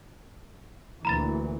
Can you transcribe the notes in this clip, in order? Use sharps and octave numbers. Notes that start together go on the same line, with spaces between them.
D2 A#2 E3 A#5 B5 A6